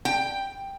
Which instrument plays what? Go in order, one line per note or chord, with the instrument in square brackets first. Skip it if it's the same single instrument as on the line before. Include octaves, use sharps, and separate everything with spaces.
[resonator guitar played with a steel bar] G5